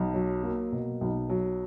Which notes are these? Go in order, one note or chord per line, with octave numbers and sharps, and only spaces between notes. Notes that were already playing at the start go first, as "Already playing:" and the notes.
Already playing: B1
F#3
A#3
B2
B1
F#3